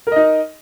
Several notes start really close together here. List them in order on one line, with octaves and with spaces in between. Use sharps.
A#4 D#5 D#4